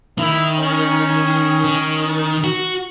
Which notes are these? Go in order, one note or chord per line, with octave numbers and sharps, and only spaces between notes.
D#3 E4
C#4
D#3
F#4